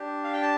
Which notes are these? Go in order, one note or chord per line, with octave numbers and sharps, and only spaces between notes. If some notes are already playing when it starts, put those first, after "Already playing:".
Already playing: D4 G4
F5
G5
A5